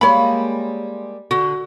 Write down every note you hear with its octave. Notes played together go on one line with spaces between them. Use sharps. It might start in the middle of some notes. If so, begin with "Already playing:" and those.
G3 G#3 A#3 C#5 B5
D3 F#4